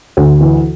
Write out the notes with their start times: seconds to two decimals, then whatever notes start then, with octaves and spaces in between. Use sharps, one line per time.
0.17 D2
0.41 E3